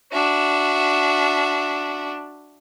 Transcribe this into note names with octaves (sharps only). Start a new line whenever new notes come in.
D4 F#4 E5